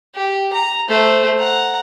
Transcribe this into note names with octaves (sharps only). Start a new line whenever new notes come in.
G4
A#5
A3 C5
F#5 A#5